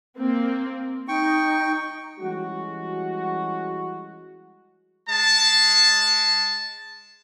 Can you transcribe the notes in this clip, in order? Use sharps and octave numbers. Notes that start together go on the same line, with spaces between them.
A#3 C4
D#4 G5 C#6
E3 G3 G#3 C#4 F#4
G#3 A5